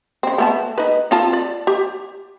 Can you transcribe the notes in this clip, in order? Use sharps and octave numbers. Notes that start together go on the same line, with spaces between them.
C#3 C4
A3 B3 A5
D#4 B4
C4 F4 A5
D5
G4